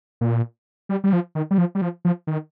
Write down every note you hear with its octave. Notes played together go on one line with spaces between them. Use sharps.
A#2
G3
G3
F3
D#3
G3
F3
G3
F3
F3
D#3